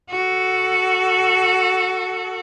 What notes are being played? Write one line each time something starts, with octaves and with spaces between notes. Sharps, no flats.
F#4 A4